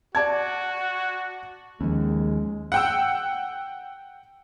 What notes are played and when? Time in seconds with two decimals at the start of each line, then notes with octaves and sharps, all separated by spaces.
0.15 F#4 D5 A5 G#6
1.81 D#2 F3 G#3 C#4
2.72 F#5 G5 E6